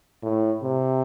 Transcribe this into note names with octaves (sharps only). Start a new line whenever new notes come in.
A2
C3